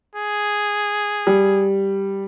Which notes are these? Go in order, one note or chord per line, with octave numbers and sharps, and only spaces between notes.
G#4
G3